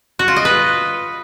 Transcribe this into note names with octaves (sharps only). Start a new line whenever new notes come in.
F#4
F4
D#5
B4